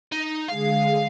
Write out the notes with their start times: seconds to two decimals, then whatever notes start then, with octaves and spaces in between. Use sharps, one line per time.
0.12 D#4
0.48 D3 G#3 G#4 F5